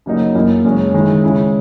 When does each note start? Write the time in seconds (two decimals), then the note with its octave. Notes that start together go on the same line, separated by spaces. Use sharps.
0.06 C#3 F#3 A#3 D#4
0.35 F#2 E3 A#3 E4
0.65 F#2 C#3 G#3 C#4
0.94 D#3 G#3 C#4 E4
1.23 C#3 G#3 C#4 E4